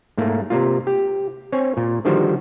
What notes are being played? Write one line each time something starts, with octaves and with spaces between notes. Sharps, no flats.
G#2 A3 A#3
C3 A#3 F4
G4
C4 C#5 G#5
A#2
D3 D#3 F3 G3 F#4 C5